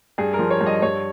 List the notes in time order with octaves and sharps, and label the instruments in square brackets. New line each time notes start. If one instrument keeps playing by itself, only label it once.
[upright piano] G2 G#4
A#4
F3
C#5
G2
D#5
G2 C#5